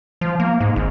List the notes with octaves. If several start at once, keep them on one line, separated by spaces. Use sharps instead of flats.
F3
A#3
G#2
G#1